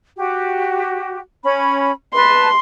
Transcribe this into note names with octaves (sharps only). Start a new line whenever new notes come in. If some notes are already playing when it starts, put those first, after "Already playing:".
F#4 G4
C#4 B5
B4 A5 C6